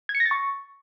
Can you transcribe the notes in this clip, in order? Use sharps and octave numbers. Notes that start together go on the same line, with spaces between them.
G#6
C#7
A#6
A6
C#6